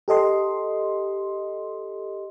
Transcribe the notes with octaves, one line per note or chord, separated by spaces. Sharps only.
G4 A4 D#5 C6